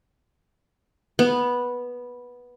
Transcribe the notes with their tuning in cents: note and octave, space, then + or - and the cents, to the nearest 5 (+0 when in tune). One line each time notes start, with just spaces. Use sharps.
B3 -10